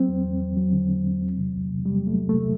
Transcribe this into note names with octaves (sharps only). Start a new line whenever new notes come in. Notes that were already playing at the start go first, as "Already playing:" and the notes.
Already playing: F#3 C4
E2
E2
E2
F#3
D3
F#3
E2
F#3
C3
C2
C3
C3 G3
F#3 A3
C2
C3 A3